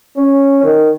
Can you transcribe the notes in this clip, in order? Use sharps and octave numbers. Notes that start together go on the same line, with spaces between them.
C#4
D#3